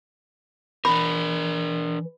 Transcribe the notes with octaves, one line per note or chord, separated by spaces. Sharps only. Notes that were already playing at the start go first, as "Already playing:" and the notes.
E3 D4 A#4 B5